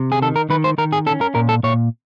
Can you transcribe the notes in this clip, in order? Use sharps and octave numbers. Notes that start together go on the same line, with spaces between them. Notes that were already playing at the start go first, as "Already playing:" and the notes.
Already playing: C3
G#4
D#3 A4
A#4
D#3 B4
C5
D#3 A#4
G#4
C#4 A4
A#4
A#2 A#4
A4
A#2 C#5